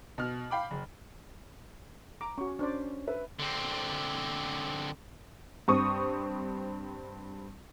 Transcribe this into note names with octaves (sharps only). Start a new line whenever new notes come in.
B2 F6
F5 G5 B5 D6
F#1
A#5 D6
C#4 F#4 C#6
C#4 D4 C5 D5
B4 E5
D3 C4
G2 C4 C#6 D#6